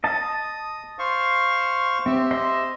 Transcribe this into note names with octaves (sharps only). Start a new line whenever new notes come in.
D#5 A5 D#6
C5 F5 C#6
C4 G4 E5
C5 D#5 C6